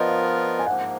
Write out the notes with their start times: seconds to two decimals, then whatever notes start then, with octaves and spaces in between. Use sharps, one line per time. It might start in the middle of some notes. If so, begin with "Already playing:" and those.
Already playing: F3 B3 F4 A#4 D5 D#5
0.09 F5
0.59 G#5
0.66 G#2 F3 A#3 F#5